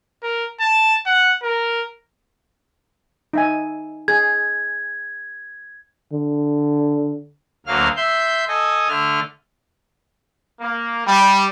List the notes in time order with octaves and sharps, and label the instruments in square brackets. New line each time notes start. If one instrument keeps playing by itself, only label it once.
[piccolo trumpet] A#4
A5
F#5
A#4
[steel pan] D#4 E5 G#5
[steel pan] G#4 [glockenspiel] G#6
[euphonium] D3
[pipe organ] D2 F#3 A#3 F5 F6
E5 C6 G6
A4 D#5 G#5
D3 A3 F6
[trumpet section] A#3
G3